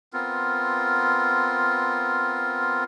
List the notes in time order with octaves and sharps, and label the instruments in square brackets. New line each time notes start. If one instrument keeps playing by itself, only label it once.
[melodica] B3 C4 F4 A#4